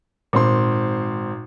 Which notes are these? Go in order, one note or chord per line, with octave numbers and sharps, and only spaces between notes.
G#1 A#2 C4 C6